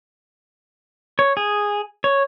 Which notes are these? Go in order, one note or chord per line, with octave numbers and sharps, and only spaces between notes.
C#5
G#4
C#5